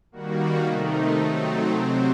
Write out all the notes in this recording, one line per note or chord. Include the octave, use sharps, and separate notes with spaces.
D#3 G3 A#3 F#4
C3 D#3 A3 D#4
F#3 A3 C4 D#4
C3 F#3 C4